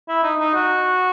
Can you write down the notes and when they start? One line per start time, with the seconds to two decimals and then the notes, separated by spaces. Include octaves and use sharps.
0.08 E4
0.23 D#4
0.39 D#4
0.54 F#4